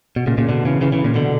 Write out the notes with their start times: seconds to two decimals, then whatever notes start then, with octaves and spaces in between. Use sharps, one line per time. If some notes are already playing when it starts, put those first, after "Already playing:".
0.16 B2
0.27 A#2 C#3
0.38 A#2 C#3
0.49 B2 D3
0.65 C#3 E3
0.81 C#3 E3
0.92 C#3 E3
1.04 A#2 C#3
1.15 B2 D3